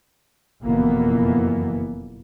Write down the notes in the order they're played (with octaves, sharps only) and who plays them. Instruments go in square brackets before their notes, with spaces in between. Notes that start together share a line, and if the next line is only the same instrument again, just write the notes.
[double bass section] F#1 F2 B2 E3 A#3 B3